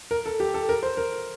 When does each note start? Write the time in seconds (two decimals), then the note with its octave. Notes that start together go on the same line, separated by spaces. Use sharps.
0.11 A#4
0.26 A4
0.40 G4
0.54 A4
0.69 A#4
0.83 C5
0.97 A#4